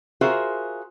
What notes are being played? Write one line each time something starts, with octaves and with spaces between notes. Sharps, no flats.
F4 F#4 G#4 A#4 C5 E5